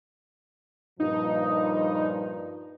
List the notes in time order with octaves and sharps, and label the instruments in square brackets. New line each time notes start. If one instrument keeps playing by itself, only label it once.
[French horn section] G2 A#2 F3 [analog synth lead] D#4